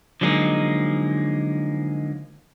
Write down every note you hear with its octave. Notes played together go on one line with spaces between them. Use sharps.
D3 F3 F#3 G#3 A#3 D#4